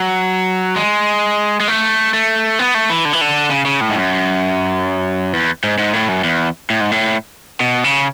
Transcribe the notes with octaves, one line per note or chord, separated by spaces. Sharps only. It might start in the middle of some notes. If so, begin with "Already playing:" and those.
Already playing: F#3
G#3
G#3
A3
A3
B3
A3
E3
D3
E3
D3
C#3
C#3
A2
G#2
F#2
E2
G#2
G#2
A2
F#2
E2
A2
G#2
A2
B2
C#3